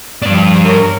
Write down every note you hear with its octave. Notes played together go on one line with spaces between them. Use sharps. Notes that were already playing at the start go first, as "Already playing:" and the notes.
G2 F3 D4
A#4 C#5